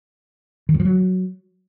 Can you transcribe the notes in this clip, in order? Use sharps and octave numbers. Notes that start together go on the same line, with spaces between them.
D#3
G2
F3
F#3